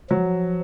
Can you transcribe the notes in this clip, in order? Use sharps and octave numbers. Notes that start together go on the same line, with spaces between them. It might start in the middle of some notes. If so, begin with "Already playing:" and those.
F3 F#3